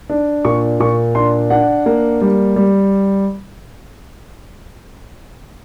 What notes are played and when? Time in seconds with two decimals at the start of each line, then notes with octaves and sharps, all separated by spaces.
0.10 D4
0.45 A#2 C#6
0.80 A#2 C#6
1.15 D4 C6
1.50 D4 F#5
1.86 A#3
2.21 G3
2.56 G3